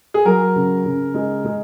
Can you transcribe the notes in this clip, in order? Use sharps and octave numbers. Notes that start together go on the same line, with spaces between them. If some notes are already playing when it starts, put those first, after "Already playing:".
G#4
F#3 A#4
C#3
C#3
G#3
G#3